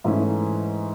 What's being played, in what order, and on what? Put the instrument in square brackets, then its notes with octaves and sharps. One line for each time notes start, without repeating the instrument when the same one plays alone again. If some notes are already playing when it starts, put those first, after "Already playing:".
[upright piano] G#2 E3 A3 C#4 E4